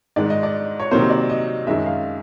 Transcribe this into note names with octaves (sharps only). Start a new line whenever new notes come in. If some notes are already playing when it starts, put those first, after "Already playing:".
G#2 D#3 G#3 D5
D#5
D5
C#5
C3 D#3 F#3 A#3 C5
D5
D#5
F#2 D#3 G#3 E5
F5